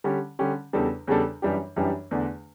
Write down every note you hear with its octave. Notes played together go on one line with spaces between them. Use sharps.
D3 G3 C#4 G4
D3 G3 C#4 G4
E2 C#3 G3 D4 A4
E2 C#3 G3 D4 A4
F#2 E3 G3 D4 G4
F#2 E3 G3 D4 G4
E2 D3 A3 D4